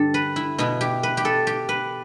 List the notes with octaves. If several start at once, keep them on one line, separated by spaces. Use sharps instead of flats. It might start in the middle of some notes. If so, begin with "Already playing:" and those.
Already playing: G2 D3 G4 A4
B4
E4
B2 B3 E4
G4
B4
G4
A4
G4
B4